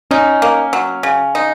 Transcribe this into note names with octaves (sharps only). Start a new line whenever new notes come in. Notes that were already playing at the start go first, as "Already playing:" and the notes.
C#4 D#4
A#3
F#3
C#3
D#4